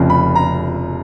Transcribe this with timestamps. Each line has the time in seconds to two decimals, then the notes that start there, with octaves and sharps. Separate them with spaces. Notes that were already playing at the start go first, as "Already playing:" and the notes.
Already playing: F1 F2 C#3
0.10 B5
0.35 A#5